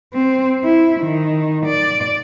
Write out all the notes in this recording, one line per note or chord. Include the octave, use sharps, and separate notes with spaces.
C4
E4
D#3
D5